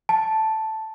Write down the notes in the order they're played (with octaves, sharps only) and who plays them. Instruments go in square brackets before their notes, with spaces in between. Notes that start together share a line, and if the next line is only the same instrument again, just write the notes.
[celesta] A5